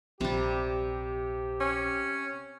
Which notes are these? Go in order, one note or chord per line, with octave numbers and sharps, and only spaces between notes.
A#1 C3 G3 G4
C#4